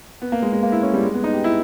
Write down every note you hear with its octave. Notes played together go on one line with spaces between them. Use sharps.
B3
A#3
G#3
G#3
A#3
E4
C#4
G3
G#3
B3
D#4
G4
E4